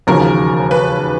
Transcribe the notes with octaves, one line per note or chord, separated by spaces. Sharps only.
E1 D#2 C#3 F3 A#4
B4